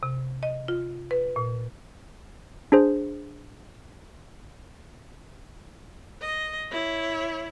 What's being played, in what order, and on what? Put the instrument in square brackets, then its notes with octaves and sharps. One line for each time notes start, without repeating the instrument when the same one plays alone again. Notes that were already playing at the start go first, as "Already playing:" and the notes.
[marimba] C3
D#5
F4
B4
A#2
[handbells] D4 G#4 C5
[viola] D#5
E4 C#5